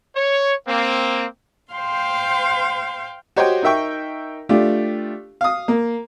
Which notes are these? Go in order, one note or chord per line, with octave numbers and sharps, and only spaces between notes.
C#5
A#3 C4
C5 F5 G5 C6
F#4 G4 C5 C#5 D#5 G5
D#4 A#4 E5 G5 C#6
A3 D4 F4 G4
F5 D#6
A#3